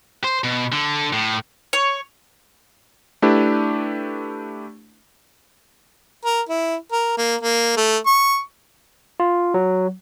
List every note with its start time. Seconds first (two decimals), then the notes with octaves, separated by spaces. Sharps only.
0.24 C5
0.44 B2
0.72 D3
1.13 A2
1.73 C#5
3.22 A3 D4 E4 G4 B4
6.25 A#4
6.49 E4
6.92 A#4
7.18 A#3
7.41 A#3
7.77 A3
8.06 C#6
9.20 F4
9.54 F#3